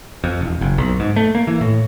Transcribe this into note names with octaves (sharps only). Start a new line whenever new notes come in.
F2
E1
F#1
B1
G#2
A3
A#3
E3
A2